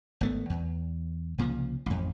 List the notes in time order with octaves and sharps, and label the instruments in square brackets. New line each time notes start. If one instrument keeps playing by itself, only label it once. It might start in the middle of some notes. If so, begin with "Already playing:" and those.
[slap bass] G#1 A3 B3
E2
C2 A#2 C#3 F3
A1 F2